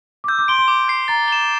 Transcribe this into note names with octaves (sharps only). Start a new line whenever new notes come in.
D6
E6 G6
D6
C6 D7 G7
C6
D6
G6 C7
A#5 A6
E7 G7